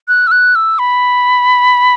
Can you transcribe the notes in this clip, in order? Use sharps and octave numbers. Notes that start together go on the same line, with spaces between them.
F#6
E6
F#6
E6
B5